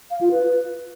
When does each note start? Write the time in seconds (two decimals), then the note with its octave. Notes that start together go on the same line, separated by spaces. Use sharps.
0.11 F5
0.21 F4
0.31 B4